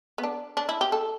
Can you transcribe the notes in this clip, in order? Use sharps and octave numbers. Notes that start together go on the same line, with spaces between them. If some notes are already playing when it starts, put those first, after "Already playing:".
B3
D4
D4
E4
G4
A4